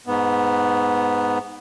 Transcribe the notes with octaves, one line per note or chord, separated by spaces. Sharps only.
G#2 B3